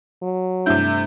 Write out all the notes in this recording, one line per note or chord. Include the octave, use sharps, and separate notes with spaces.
F#3
G2 C3 A3 D4 E4 G6